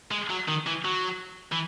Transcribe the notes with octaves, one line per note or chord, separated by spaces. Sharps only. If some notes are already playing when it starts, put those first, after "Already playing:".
G#3
F#3
D#3
E3
F#3
E3